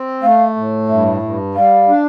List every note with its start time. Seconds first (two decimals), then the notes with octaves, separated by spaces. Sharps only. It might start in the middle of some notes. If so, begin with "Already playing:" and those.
Already playing: C4
0.23 A3 F5
0.56 A2
0.89 G2 E5
1.22 G2
1.55 G3 F5
1.88 D4